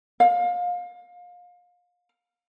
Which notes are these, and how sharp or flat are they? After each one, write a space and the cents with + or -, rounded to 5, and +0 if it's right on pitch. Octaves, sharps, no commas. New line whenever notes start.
F5 +30